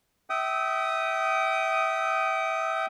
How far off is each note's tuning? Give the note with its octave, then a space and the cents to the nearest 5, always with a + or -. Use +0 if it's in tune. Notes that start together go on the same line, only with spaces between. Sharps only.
E5 -15 G5 -35 D#6 +0